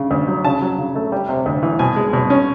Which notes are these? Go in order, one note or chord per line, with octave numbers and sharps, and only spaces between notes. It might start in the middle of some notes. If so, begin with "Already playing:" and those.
Already playing: C#3
D2
F#3
C#3 A5
F#3
C#3
A3
G3
C3
D2
E3
B2 G#5
G#3
B2
C#4